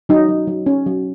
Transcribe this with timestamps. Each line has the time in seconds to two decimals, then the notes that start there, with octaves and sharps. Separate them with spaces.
0.09 F#3 D#4
0.28 F#3
0.47 F#3
0.66 C#4
0.86 F#3